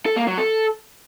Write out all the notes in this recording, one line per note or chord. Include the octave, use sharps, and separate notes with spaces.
A4
A#3
F#3
A4